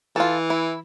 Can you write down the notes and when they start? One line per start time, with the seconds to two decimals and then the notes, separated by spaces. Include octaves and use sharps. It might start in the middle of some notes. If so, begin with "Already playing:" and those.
0.16 E3 F4 A4
0.50 E4